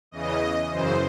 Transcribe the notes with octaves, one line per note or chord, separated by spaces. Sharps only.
E2 C#3 E3 D#5
F#2 C#3 E3 C5